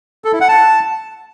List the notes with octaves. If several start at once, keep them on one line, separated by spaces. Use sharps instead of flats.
A4
E4
F#5
A5